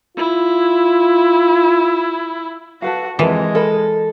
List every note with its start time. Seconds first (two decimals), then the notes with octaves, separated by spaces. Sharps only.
0.17 E4 F4
2.82 F#4 A4 B4 F5
3.19 F2 E3 G#3 A4 A#4
3.55 A4 A#4 D#5 B5